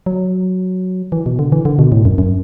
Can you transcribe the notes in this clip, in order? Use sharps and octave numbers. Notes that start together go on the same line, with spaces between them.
F#3
E3
B2
D3
E3
D3
B2
A2
F#2
F#2